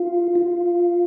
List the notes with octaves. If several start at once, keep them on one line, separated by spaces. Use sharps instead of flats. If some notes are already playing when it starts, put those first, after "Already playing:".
Already playing: F4
F4